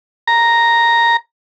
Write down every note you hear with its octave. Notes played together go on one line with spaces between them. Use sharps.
A#5